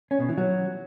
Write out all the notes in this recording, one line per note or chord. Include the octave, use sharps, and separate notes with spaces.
C#4
B2
E3
F#3